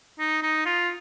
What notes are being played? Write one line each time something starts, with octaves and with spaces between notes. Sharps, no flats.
D#4
D#4
F4